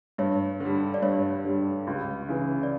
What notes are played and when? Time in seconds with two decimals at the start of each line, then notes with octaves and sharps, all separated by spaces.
0.18 G2 C#5
0.60 D3 G3
0.94 D5
1.02 G2 C#5
1.44 D3 G3
1.87 C#2
2.29 C#3 E3
2.63 D5